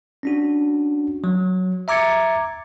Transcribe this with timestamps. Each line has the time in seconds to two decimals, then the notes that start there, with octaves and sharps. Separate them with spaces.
0.23 C#4 D4 F#4
1.24 F#3
1.88 E5 A#5 D6 G#6 A6 C#7